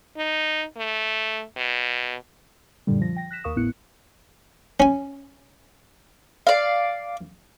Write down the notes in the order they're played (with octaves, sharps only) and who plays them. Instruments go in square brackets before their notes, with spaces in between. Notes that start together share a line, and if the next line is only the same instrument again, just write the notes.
[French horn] D#4
A3
B2
[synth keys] F#2 A#2 D3 G3
F3 A#6
G5 A#6
F#6 A#6 B6 E7
D#2 A#4 F5 C#6 D#6 E7
G#1 A2 B3 E4 F#6 C#7
[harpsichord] C#4 G#5
[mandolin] D5 F5